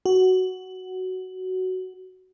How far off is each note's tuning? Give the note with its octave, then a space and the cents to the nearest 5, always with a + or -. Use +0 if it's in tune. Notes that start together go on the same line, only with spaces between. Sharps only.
F#4 +10